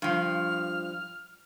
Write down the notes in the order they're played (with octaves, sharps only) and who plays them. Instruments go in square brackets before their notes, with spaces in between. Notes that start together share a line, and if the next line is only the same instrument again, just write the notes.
[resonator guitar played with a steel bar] G2 F3 [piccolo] F6